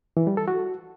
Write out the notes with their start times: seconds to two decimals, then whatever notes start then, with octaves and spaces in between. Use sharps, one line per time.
0.17 E3
0.27 G3
0.37 A4
0.48 F#4